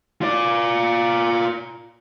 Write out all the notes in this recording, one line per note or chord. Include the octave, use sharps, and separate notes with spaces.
F4 D5